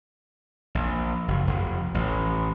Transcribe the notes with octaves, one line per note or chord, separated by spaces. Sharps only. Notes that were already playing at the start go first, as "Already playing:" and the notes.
A#1
F#1
F1
A1